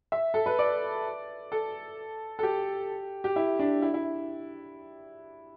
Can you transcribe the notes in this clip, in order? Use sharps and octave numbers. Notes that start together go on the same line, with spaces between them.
E5
A4
B4
D5
A4
A4
G4
G4
E4
D4
E4
E4